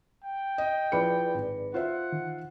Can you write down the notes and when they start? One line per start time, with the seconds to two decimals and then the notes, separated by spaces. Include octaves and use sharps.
0.24 G5
0.58 D#5
0.92 F3 E4 G#4 B4 D5 C#7
1.34 G#1
1.74 F4 C5 E5 F#5
2.12 D#3